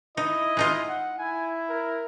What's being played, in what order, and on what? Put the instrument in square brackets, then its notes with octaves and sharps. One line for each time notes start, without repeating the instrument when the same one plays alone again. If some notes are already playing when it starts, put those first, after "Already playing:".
[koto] D#4 [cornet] E4 [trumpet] D#5
[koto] G#3 D#4 F4
[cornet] F#5
[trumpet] E4 [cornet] G#5
[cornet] A#4